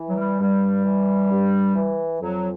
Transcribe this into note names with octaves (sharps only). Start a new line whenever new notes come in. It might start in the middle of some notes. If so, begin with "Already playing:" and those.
Already playing: E3
F#3
G3
G2 G3
E3
G2
E3
F2 F#3